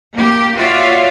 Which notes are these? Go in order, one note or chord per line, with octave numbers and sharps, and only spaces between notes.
A#3 G4
F4 F#4 C#5 D5 E5 F5